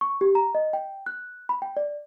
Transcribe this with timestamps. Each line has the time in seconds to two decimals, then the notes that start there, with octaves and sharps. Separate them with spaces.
0.01 C#6
0.21 G4
0.35 A#5
0.55 D#5
0.73 G5
1.06 F#6
1.49 B5
1.62 G5
1.77 D5